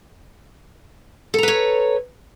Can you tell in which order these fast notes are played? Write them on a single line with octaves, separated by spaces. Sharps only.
A4 A#5 B4 C#5